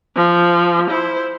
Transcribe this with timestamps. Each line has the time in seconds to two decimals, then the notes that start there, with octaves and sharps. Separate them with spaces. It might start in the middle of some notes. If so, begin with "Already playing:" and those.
0.16 F3
0.89 E4 C5